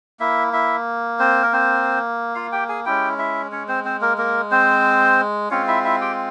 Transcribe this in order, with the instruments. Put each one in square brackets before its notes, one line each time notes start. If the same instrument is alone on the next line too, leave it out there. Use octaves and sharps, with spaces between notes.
[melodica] A#3 E4 E5
E4 E5
C4 C5
A#4
C4 C5
F4 F5
G4 G5
G#4 G#5
G#3 C#4 E4 G4 G5
E4 E5
C#4 C#5
C4 C5
C4 C5
A#3 A#4
A#3 A#4
C4 C5
G#3 C4 C#4 F4 C#5
E4 E5
E4 E5
G4 G5